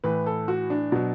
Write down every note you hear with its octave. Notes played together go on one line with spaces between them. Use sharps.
A2 E3 B4
A4
F#4
D4
B2 F#3